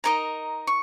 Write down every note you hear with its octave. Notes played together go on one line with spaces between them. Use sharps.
D#4 A#4 D#5 A#5
C#6